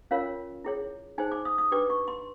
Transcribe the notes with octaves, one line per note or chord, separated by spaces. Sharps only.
C#4 F4 A#4 C#5 F5
E4 G#4 C#5
D#4 G#4 C5 G#5
D6
D#6
D#6
D4 G4 B4 D6
C#6
C6